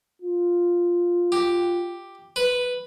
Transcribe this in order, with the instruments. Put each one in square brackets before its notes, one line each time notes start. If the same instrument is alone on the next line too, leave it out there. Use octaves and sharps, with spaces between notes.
[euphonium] F4
[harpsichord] G4
B4